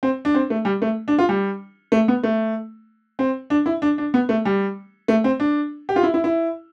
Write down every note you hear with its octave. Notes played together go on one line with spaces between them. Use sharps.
C4
D4
C4
A3
G3
A3
D4
F4
G3
A3
B3
A3
C4
D4
E4
D4
D4
B3
A3
G3
A3
C4
D4
G4
F4
E4
E4
E4